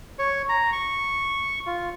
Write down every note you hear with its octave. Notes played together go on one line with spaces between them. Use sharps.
C#5
A#5
C#6
F4